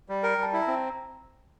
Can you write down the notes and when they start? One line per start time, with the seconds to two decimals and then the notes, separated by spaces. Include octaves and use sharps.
0.09 G3
0.23 A#4 G5
0.38 G3 A5
0.53 E4
0.62 A#5
0.67 C4